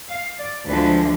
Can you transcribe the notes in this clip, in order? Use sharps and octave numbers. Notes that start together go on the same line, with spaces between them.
F5
D5
D2 D3 F3 G#3 D4 B4